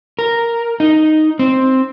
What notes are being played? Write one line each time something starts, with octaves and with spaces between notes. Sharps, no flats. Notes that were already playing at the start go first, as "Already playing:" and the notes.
A#4
D#4
C4